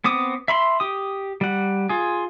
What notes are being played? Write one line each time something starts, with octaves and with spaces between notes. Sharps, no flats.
B3 C4 D6 D#6
E5 B5 C6
G4 D#6
G3 F#5
F4 G#4